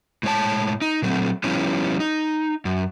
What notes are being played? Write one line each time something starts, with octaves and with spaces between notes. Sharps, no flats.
A2 G#3 C#5 A5
D#4
A#2 F#3 A3 C4
F3 G3 B3 C#4 E4
D#4
F#2